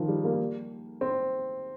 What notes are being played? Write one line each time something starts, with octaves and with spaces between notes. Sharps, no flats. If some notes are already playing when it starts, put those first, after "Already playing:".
Already playing: D#3 F3
G3
A#3
C4